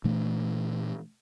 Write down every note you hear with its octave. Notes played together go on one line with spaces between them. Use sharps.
A#2 E3 A3 D4